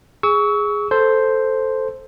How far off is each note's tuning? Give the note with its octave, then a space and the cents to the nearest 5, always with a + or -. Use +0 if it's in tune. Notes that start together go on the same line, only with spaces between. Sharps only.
G#4 -5 C#6 +25 E6 -30
A4 +0 C5 +0